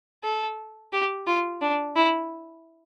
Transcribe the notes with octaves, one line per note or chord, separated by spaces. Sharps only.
A4
G4
F4
D4
E4